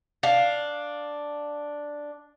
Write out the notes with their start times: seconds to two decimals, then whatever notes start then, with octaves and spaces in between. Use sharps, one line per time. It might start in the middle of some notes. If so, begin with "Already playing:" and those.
0.23 D4 F5